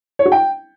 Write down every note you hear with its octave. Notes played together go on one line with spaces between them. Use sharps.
C#5
F#4
G5